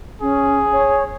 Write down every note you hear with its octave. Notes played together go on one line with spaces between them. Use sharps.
C#4 G#4
C#5